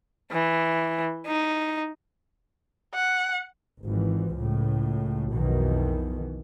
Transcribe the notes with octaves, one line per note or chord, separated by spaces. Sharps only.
E3
D#4
F#5
G#1 E3 F3
C#2 A2
B1 F2 B2 D#3 E3